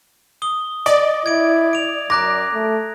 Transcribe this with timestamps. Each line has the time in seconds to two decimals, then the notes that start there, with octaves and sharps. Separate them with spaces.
0.42 D#6 G7
0.86 D5 D#5
1.26 E4 G#6 D7
1.73 D7 F7
2.10 F#2 A#5 D6 F#6 A#6
2.53 A3